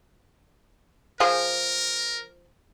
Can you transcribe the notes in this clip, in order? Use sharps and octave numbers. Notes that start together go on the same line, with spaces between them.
F3 G#4 A#4 C5